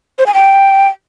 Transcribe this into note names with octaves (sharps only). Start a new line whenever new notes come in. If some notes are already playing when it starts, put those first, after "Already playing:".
C5
G#5
G5